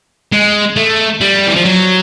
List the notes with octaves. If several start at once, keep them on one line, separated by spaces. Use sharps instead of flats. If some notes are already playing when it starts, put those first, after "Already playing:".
G#3
A3
G3
E3
F3
F#3